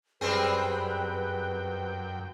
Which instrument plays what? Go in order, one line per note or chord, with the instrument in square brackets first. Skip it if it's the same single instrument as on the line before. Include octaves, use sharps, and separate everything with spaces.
[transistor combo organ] F#2 G5 [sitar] G3 C4 G#4 [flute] B4